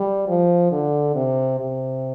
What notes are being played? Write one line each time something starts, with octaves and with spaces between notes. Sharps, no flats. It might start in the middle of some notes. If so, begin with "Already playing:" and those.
Already playing: G3
F3
D3
C3
C3